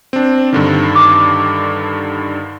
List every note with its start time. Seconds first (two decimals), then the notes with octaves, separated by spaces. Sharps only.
0.13 C4 D4
0.53 G2 D3 D#3
0.96 D6